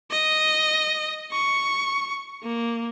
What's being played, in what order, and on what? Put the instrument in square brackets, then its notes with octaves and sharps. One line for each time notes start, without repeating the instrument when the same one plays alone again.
[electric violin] D#5
C#6
A#3